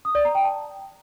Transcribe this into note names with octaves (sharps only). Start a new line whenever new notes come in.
D#6
D5
A#5
G5
A5